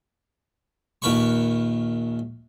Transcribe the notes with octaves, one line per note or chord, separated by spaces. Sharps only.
A#1 D#2 A#4 B4 B5 C#6